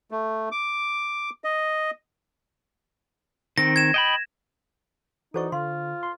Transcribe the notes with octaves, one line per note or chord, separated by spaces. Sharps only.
A3
D6
D#5
D#3 C4 A#6
G#6 E7
D#5 G5 B5
E3 D#4 F#4 A4 C5 D5 C#6
D3 F4 F5 C6
C6